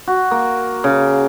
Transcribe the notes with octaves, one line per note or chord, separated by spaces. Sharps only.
F#4
A#3
C#3